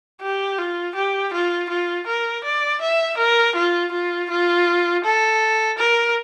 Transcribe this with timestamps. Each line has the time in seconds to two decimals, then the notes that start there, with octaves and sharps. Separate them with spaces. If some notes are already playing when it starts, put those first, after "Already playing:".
0.22 G4
0.58 F4
0.95 G4
1.33 F4
1.69 F4
2.07 A#4
2.44 D5
2.81 E5
3.18 A#4
3.55 F4
3.92 F4
4.30 F4
5.04 A4
5.78 A#4